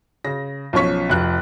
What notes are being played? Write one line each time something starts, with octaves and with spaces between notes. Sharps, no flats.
C#3 A#6
B1 F3 C#4 C#6 B6
F1 F2 F#6